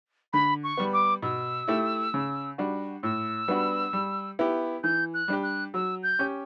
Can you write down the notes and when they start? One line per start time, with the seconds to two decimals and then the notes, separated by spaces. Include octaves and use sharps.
0.33 D3 B5
0.64 C#6
0.77 G3 B3
0.93 D6
1.22 B2 E6
1.68 A3 E4 G4
2.14 C#3
2.58 G3 D4 F#4
3.03 A2 E6
3.48 G3 B3 D4 F#4
3.93 G3
4.39 B3 E4 G4
4.83 E3 G6
5.14 F#6
5.28 G3 D4 G4
5.43 F#6
5.74 F#3 E6
6.03 G6
6.19 C#4 G4